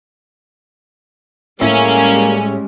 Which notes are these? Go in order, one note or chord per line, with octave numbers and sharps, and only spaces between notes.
A2 G3 G#3 A#3 C#4